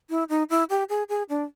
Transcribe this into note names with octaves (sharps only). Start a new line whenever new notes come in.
E4
D#4
E4
G4
G#4
G#4
D4